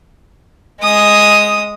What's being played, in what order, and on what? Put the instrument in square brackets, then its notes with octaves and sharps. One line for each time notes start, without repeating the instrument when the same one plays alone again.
[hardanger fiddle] G#3 D#6